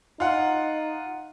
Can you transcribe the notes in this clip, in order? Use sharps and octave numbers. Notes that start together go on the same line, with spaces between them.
D#4 F4 F#5